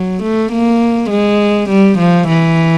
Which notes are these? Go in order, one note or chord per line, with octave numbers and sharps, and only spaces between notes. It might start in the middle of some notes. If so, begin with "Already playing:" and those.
Already playing: F#3
A3
A#3
G#3
G3
F3
E3